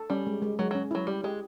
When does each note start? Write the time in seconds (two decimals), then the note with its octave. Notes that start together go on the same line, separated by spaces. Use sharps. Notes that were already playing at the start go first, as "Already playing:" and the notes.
Already playing: A4
0.10 G3 C#4
0.27 G#3
0.42 G#3
0.59 F#3 G#3
0.71 F#3 C#4
0.91 F#3 E4
1.07 G3 G4
1.24 G#3 G4